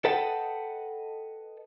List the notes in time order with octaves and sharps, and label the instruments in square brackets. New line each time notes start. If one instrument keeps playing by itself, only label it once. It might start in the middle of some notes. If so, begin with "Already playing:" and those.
[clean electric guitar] A4 B4 D#5 F#5 G5 A5